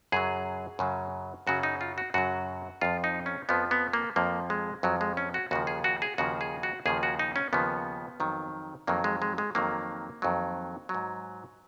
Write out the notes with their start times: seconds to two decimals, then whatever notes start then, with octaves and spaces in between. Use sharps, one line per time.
0.12 F#2 C#3 F#3 G#4
0.79 F#2 C#3 F#3
1.47 F#2 C#3 F#3 F#4
1.63 D#4
1.81 F4
1.98 F#4
2.14 F#2 C#3 F#3 F#4
2.81 F2 F3 F4
3.04 D#4
3.26 C#4
3.49 F2 F3 B3
3.71 B3
3.93 A#3
4.16 F2 F3 A#3
4.50 G#3
4.83 F2 F3 F#3
5.01 G#3
5.17 C#4
5.34 F#4
5.51 D#2 C#3 F3 F#4
5.67 G#4
5.84 F#4
6.02 G#4
6.18 D#2 C#3 F3 F#4
6.41 G#4
6.63 F#4
6.86 D#2 C#3 F3 G#4
7.03 F#4
7.19 D#4
7.36 C#4
7.53 D#2 C#3 F3 B3
8.20 F2 D#3 F#3
8.87 F2 D#3 F#3 A#3
9.04 G#3
9.22 G#3
9.38 G#3
9.55 F2 D#3 F#3 A#3
10.22 F2 D#3 F#3
10.89 F#3
10.94 G#2